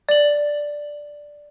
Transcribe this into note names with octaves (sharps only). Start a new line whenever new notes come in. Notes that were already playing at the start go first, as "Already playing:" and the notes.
D5 F#7